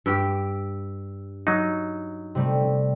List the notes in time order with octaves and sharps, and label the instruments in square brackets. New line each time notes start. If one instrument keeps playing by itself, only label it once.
[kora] G2 G4 [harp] E6 D7
[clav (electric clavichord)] F#3 D#4
[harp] C3 G3 A3